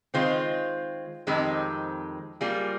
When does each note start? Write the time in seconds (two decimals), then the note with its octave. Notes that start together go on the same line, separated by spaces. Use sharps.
0.14 D#3 G#3 C4 F4 C5
1.27 F2 D#3 G#3 C4 G4
2.41 G3 A#3 F4 G#4